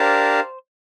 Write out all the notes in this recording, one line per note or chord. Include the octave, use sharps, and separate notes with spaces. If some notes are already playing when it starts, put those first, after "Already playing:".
Already playing: D4 G4 A#4 C5 F5 A5